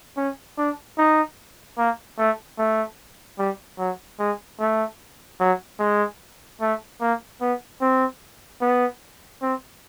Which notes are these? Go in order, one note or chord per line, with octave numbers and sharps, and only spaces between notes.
C#4
D4
D#4
A#3
A3
A3
G3
F#3
G#3
A3
F#3
G#3
A3
A#3
B3
C4
B3
C4